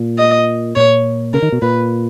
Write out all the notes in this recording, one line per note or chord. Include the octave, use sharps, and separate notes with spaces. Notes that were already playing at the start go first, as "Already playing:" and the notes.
Already playing: A#2
D#5
A#2 C#5
C#3 A#4
D#3
B2
A#2 B4